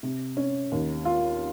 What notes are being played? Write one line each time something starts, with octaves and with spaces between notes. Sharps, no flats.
C3
C#4
D#2
F4